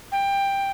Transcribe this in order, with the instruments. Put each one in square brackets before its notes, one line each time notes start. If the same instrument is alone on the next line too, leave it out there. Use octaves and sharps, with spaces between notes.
[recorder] G5